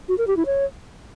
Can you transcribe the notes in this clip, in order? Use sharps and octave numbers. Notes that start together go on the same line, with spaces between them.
F#4
A#4
G4
E4
C#5